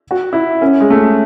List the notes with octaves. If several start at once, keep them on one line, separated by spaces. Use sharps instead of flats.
F#4
E4
C#4
G#3
A3